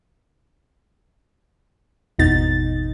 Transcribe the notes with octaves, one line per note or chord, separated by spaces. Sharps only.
G#1 E2 B2 D#4 A6